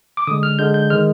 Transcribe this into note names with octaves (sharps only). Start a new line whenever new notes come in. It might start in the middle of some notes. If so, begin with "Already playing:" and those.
D6
D3 G#3 D#6
F6
D3 G#3 G6
G6
D#3 G#3 F6